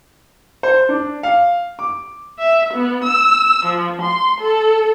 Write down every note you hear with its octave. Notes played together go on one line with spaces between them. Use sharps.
C5
D4
F5
D6
E5
B3
E6
F3
C6
A4